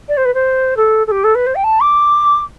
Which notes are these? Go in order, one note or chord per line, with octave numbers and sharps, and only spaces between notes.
D5
C5
B4
C5
A4
A4
G4
A4
B4
C5
G5
A5
D6